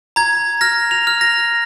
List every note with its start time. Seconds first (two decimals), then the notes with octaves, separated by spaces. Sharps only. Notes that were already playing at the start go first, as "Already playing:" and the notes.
0.16 A#5 G#6
0.61 F6 A#6
0.91 F7
1.07 F6
1.21 A#6